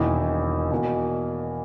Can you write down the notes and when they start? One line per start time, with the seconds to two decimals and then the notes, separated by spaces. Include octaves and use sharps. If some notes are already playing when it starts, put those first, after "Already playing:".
Already playing: E1 E2 D#3 A#3 E4
0.71 E2 B2 A#3